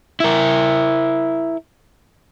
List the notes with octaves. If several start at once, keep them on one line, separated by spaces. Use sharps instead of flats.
E4 A#4